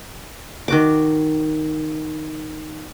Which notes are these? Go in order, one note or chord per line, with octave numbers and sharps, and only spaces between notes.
D#3 F#4 D6